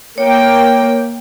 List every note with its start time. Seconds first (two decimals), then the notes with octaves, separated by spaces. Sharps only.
0.18 A#3 C#5 G5